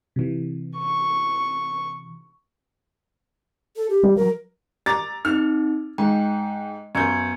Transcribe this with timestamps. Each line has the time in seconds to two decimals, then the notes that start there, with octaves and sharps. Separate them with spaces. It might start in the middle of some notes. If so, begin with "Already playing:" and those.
0.16 C3 E3
0.77 C#6
3.76 A4
3.90 G4
4.03 G3
4.16 F3 F#3 A#4
4.86 A#5 D6 A6
5.25 C4 D#4 F6
5.98 G#2 G5
6.95 F#2 B3 G6 G#6 C#7